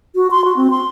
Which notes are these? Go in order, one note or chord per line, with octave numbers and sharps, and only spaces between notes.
F#4
C6
F#4
C4
C6